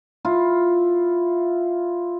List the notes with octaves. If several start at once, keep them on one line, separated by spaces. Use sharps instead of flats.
E4 F4